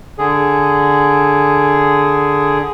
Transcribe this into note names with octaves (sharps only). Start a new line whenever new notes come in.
D3 G#4